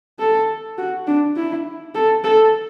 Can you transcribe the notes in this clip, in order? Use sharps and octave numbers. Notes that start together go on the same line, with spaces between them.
A4
F#4
D4
E4
A4
A4